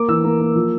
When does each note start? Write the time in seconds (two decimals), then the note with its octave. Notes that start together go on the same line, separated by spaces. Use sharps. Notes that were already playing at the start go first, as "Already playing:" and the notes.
Already playing: A#3 D6
0.08 E3 E6
0.24 A#3
0.40 A#3
0.55 F3